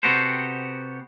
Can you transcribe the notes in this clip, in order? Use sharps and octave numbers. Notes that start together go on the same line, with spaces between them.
C3 B3 F#4 G4 A4 C5